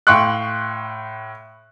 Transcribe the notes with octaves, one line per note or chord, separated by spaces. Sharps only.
A2 F5 G5 C6 C#6 F#6